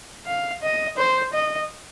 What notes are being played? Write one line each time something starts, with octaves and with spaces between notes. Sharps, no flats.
F5
D#5
C5
D#5